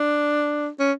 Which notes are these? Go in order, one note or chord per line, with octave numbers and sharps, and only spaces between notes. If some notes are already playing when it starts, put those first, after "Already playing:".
Already playing: D4
C#4